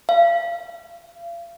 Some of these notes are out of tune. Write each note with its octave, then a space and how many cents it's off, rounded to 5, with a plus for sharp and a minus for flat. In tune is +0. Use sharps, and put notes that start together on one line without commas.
F5 -40